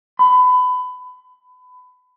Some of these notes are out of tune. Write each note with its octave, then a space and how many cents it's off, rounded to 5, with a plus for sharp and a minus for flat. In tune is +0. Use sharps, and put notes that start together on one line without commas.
B5 +25